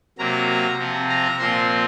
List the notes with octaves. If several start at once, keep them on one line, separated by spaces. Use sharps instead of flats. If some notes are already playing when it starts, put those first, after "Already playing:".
C3 F#3 A#3 A#5
C3 F3 C4
A#5
A#2 F3 C4 C6